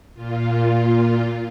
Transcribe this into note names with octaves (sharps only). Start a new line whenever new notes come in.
A#2 F4